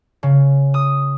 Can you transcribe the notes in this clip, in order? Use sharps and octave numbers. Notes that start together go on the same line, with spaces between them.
C#3
D#6